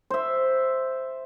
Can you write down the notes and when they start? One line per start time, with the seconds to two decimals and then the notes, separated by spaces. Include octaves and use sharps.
0.10 C5 E5